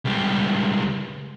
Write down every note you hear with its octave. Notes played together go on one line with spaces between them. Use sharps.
C#2 G3